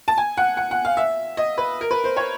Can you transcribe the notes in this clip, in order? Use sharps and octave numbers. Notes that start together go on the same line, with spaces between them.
A5
G#5
F#5
F#5
F#5
F5
E5
D#5
B4
A#4
B4
C5
C#5